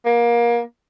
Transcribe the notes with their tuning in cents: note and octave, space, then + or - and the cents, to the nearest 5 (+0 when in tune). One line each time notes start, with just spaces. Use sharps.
A#3 +25